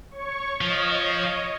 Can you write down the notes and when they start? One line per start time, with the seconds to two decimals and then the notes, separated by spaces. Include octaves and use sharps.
0.11 C#5 C#6
0.61 F3 C#5 D#5